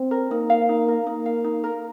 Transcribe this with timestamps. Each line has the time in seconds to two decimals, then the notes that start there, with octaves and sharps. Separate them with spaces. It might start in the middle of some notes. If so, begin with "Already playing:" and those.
Already playing: C4
0.11 A#4
0.31 A#3 D#4
0.50 F5
0.69 D#4
0.88 A#4
1.07 A#3 D#4
1.26 F5
1.44 D#4
1.64 A#4